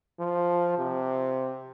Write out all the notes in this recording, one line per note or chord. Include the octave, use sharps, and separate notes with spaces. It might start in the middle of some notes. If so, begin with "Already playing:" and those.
F3
C3